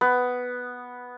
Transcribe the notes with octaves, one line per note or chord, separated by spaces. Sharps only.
B3